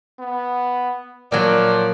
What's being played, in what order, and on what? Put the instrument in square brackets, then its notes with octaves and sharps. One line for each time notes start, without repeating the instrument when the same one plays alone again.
[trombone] B3
[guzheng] A#2 F#3 [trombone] F3 [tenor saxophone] D5